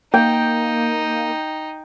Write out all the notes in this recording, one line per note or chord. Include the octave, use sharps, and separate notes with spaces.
A#3 D#4 G5